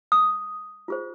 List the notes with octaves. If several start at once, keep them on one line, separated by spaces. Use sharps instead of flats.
D#6
F4 G#4 C5